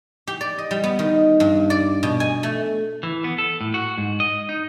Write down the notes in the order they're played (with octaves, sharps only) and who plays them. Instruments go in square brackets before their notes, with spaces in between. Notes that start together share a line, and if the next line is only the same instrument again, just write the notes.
[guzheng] G4
D5
D#5
G3
B3
D#3
G2
D5
B2
G#5
A3
[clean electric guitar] E3
B3
A4
A2
F#4
G#2
D#5
D#4